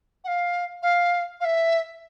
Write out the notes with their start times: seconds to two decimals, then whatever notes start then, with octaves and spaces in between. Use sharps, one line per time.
0.24 F#5
0.27 F5
0.82 F5
1.40 F5
1.44 E5